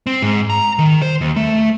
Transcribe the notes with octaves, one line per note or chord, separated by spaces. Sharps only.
C4
G#2
A#5
D#3
C5
D#2
A3